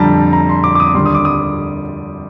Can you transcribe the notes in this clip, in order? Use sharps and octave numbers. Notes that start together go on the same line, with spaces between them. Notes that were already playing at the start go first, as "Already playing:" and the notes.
Already playing: F2 D3 G3 A5 A#5
A#5
C6
D6
D6
D#6
D#2 D3 G3 C6
D#6
D6
D#6